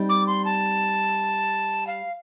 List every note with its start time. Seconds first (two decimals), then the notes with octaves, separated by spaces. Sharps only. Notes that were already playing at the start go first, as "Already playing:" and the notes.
Already playing: G3 C4 D#4
0.09 D6
0.27 C6
0.45 A5
1.87 F5